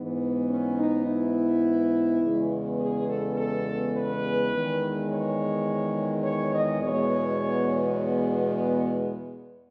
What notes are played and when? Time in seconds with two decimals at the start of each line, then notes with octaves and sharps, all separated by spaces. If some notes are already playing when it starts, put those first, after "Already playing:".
Already playing: G#2 E3 B3
0.49 C#4
0.78 D#4
1.06 E4
2.21 E2 C#3 G#3 B3
2.78 G#4
3.08 A4
3.36 A4
3.93 B4
4.52 E2 D#3 G#3
5.09 C#5
6.24 C#5
6.53 D#5
6.82 E2 B2 G#3 B3 C#5